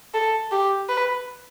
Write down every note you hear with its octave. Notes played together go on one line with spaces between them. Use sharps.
A4
G4
B4